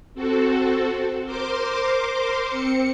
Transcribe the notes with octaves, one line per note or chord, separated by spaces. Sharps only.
C4 F#4 A4
A#4 C5 C6 D6
C4 C#7